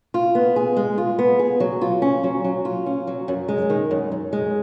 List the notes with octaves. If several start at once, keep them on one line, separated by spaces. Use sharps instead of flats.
F4
B3
G#4
G#3
F4
B3
G#4
F#3
F4
C#4
F#3
F#3
F4
C#4
F#3
F#2
G#3
D#3
F#2
F#2
G#3